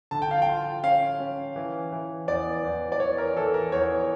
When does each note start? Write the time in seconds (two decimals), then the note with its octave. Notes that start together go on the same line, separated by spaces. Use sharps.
0.11 D3 A5
0.22 G5
0.31 F5
0.42 G5
0.48 F4
0.83 C#4 F5
1.20 C#4
1.56 E3
1.92 E3
2.28 E2 D5
2.64 E2
2.92 D5
3.00 E3 C#5
3.18 A#4
3.36 E3 A4
3.54 A#4
3.72 E2 C#5